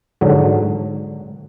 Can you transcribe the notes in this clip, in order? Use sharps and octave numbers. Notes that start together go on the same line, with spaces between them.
G#2 D3 F#3